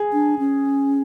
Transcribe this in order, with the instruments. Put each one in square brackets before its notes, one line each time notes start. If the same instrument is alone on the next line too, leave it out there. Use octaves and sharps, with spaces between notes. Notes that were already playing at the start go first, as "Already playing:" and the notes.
Already playing: [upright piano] G#4
[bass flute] D4
C#4